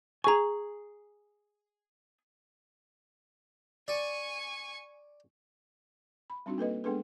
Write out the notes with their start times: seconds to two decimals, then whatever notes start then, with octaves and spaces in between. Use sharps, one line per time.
0.24 G#4 G#5 A#5 C#6
3.88 D5 G#5 C#6
6.30 B5
6.46 G3 C4 D4 D#4 F#4
6.58 A#3 A4 B4 D#5
6.84 G#3 B3 D4 G#4 A4 B4